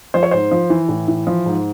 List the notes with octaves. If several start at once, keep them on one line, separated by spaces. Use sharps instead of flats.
F3 C5
C#5
G#2 C5
F3
E3
A2
E3
F3
G#2